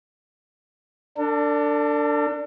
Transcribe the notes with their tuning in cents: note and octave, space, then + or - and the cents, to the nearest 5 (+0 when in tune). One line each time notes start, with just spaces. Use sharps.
D4 +0 A4 +45